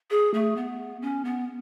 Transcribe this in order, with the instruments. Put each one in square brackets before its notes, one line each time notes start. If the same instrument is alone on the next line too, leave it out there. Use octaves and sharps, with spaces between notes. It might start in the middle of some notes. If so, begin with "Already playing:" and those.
[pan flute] G#4
A3
B3
C#4
B3